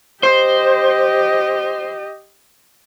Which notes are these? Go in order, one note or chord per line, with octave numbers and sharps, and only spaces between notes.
G4 C5 D#5